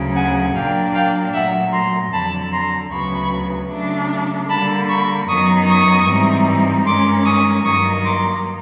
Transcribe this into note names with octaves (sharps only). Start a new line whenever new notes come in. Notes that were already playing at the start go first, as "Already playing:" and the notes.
Already playing: D2 C#3 F#3
F#5 G#5
A#2 F#3 A#3 D4 F5 G5
F5 G5
A#2 F#3 A3 E5 F#5
A#5 C6
F2 D3 F#3 A5 B5
A#5 C6
D2 C#3 F#3 B3 B5 C#6
C#3 F#3 A3 D4
D3 G3 A#3 A5 B5
B5 C#6
F#2 D#3 F#3 B3 D#4 C#6 D#6
C#6 D#6
G#2 E3 G3 C4 D#4
G2 D#3 G#3 C#4 C6 D6
C#6 D#6
G2 D#3 F#3 A#3 D#4 C#6 D#6
C6 D6